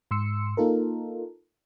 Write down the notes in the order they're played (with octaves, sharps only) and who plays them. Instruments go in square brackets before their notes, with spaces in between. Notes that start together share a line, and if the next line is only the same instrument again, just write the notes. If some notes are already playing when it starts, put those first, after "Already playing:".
[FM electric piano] G#2 C6 E6 C#7
A#3 D#4 F4 A4 A#4